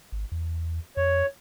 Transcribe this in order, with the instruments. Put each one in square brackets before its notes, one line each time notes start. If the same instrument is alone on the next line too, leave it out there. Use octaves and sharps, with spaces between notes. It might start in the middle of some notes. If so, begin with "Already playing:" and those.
[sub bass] G#1
E2
[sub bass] F2 [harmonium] C#5